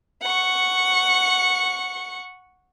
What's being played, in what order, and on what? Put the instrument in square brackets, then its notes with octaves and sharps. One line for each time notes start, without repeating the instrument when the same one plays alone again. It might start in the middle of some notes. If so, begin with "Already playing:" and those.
[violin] F#5 C#6